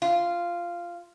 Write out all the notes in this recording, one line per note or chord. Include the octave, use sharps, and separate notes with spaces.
F4